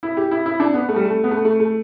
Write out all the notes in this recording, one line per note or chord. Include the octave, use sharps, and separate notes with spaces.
E4
G4
E4
E4
D4
B3
A3
G3
A3
B3
A3
A3
A3